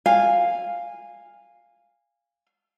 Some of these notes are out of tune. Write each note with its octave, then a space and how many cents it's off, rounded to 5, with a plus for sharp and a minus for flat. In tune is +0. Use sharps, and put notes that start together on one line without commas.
F5 +0 G#5 -15